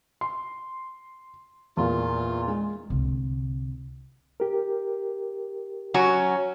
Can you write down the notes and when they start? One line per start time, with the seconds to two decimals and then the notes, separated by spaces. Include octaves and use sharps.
0.21 C6
1.77 E2 A#2 F4
2.48 G#3
2.90 C2 D3
4.40 G4 A#4
5.94 F#3 C#4 F#4